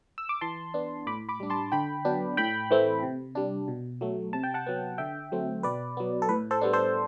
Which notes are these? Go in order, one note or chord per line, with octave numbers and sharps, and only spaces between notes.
E6
D6
E3 A5 C6
B3 D4
A2 B5 D6
B5 D6
G3 D4
A5 C6
D3 G5 B5
F#3 B3 D4
A2 G5 B5
E3 A3 C4
C3
G3 D4
B2
F#3 A3
C3 A5
G5
F#5 A5
F#3 B3
D3 E5 G5
F#3 A3 C4
B2 B4 D5
F#3 B3
A4
A2 B4
A4 C5
G3 B3 D4
A4 C5